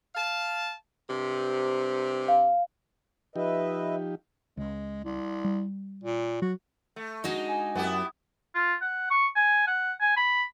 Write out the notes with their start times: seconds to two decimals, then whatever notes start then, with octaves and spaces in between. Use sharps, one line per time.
0.15 F5 A5
1.10 G2 C3
2.28 F5
3.36 F3 D#4 G4 B4 D#5 E5
4.57 C#2 G#3
5.04 C2
5.44 G3
6.03 A#2
6.42 F#3 F#4
6.96 A3
7.24 G#3 D4 D#4 F#4
7.48 G#5
7.75 F#2 B3 E4 G4
8.55 F4
8.81 F#5
9.11 C#6
9.36 G#5
9.67 F#5
10.01 G#5
10.17 B5